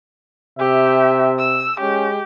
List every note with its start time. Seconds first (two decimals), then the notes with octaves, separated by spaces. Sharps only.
0.59 C3 G4 E5
1.38 E6
1.80 G#3 C#4 G4